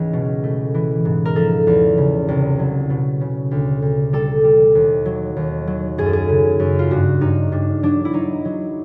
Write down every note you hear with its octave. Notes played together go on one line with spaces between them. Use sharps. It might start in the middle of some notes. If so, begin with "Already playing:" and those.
Already playing: C#2 G#2 E3
B2
A3
E3
G#2
A#4
F3 A4
E2
C#3
C2
F#3
B2
C#3
D2
D2
G3 A4
G3
D#2
F#3
D#2
F#3
F#2 G#4
A4
G#4
C#3
F#2
F4
G2 F#4
G2 D#4
G2 D4
F#3 D4
E4
F#3 D#4
F#3